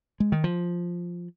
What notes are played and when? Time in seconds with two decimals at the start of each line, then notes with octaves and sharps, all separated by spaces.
0.20 G#3
0.32 D#3
0.44 F3